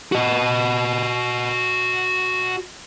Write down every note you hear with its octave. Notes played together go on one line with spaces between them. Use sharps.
F#4 D#5